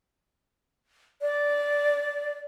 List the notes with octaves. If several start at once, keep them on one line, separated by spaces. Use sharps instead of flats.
D5